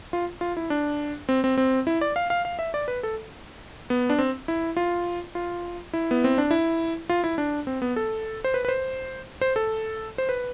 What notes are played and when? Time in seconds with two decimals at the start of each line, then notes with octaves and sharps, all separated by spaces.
0.13 F4
0.41 F4
0.57 E4
0.70 D4
1.29 C4
1.44 C4
1.58 C4
1.87 E4
2.01 D5
2.16 F5
2.30 F5
2.45 F5
2.59 E5
2.74 D5
2.88 B4
3.03 A4
3.90 B3
4.10 D4
4.19 C4
4.48 E4
4.77 F4
5.35 F4
5.93 E4
6.11 B3
6.24 C4
6.38 D4
6.51 E4
7.09 F4
7.24 E4
7.38 D4
7.67 C4
7.82 B3
7.96 A4
8.44 C5
8.54 B4
8.65 B4
8.68 C5
9.41 C5
9.56 A4
10.18 C5
10.29 B4